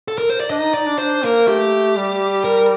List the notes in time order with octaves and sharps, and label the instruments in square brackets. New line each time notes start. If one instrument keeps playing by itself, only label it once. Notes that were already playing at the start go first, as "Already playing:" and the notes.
[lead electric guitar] A4
A#4
C5
D5
[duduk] D4 [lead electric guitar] D#5
[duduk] D#4
[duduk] D#4 [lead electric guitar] D5
[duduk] D4
[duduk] D4 [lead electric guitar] C5
[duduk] A#3 [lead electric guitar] A#4
[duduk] A3 [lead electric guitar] G4
[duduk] G3
[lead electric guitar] A#4